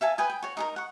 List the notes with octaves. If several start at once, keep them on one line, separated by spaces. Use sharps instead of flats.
E5 F5 G#5 A5
B4 G5 G#5 D#6
G5
F#4 C#5
D#4 G#4 A#4
F#5 C#6